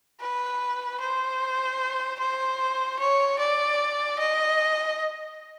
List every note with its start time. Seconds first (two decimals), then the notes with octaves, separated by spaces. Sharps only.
0.21 B4
1.00 C5
2.19 C5
2.99 C#5
3.39 D5
4.19 D#5